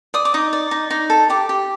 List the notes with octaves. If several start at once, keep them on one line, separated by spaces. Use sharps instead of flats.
D5 D#6
D6
D#4 D#6
D5
D#4
D#4
A4
G4 D6
G4